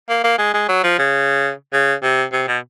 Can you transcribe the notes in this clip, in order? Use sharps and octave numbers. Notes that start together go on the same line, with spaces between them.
A#3
A#3
G#3
G#3
F#3
F3
C#3
C#3
C3
C3
B2